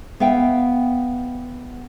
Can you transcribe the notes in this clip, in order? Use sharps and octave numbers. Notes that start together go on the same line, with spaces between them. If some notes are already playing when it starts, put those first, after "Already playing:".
B3 E5 F5 G5